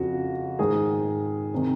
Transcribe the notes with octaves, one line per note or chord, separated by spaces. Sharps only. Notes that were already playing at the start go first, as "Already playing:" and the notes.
Already playing: F2 C#3 F#4
G#2 D#3 G#4
C3 D#3